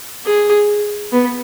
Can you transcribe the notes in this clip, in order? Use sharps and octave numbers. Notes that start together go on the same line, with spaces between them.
G#4
B3